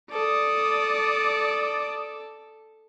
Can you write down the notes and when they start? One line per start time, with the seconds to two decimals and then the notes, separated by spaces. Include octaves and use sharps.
0.11 A4 D5 D#6